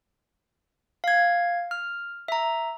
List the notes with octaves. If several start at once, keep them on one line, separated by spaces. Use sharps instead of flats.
F5 G#6
F6
E5 A#5